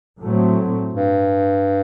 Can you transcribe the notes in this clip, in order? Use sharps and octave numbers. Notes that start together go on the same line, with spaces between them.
A2 F#3 A3 C4
G2